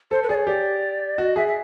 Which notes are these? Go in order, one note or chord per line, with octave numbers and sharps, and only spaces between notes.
A4 C5
B4
G#4 D5
C#5
G4 D5
F#4 D#5
G#4 E5
E5